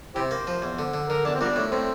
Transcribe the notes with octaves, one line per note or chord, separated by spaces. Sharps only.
C3 E4 G4 C5
A#3
F3
E2
D3
D3
D3 A#4
E2 D4
C4
F3 G3 A#3 D4
A2
A2 C4